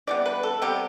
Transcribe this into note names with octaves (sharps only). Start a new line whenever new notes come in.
E3 G3 B3 D5
B4
A4
C3 G3 B3 G4